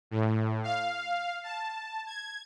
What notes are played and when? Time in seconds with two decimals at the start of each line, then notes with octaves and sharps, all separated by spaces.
0.11 A2
0.63 F5
1.43 A5
2.07 G#6